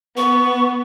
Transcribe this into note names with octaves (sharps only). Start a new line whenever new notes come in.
B3 C#6